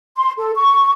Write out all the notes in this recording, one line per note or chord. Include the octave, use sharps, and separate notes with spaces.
C6
A4
C#6